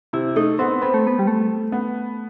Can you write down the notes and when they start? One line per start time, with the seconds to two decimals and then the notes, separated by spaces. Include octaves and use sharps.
0.13 C3 E4
0.36 A3 D#4
0.59 B3 C4
0.82 B3 C4
0.94 A3
1.07 B3
1.19 G3
1.27 A3
1.72 B3